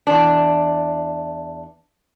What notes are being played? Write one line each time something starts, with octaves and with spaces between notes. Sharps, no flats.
E2 D4